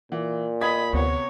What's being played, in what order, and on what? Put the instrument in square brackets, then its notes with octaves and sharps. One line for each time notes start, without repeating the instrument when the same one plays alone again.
[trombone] A#2 [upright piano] E3
[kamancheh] D#5 B5 [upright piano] D#6 G#6 B6
[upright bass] D2 [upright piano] C3 B3 [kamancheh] C#5